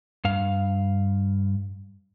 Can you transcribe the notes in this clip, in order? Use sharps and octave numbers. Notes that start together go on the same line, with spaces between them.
G2 F5